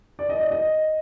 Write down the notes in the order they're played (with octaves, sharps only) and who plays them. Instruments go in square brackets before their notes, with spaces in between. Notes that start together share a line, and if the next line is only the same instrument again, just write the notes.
[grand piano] D5
D#5
D5
D#5